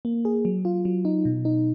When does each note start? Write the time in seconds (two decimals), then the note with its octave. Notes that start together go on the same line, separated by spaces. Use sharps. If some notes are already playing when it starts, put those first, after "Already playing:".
0.05 A#3
0.25 G#4
0.45 F#3
0.65 F4
0.85 F#3
1.05 D#4
1.25 B2
1.45 D#4